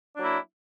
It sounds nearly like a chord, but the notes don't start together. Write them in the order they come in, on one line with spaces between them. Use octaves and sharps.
D4 F#3 A#3 E4